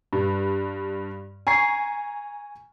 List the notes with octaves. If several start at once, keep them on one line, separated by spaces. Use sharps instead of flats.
G2
G#5 A#5 C#6 C7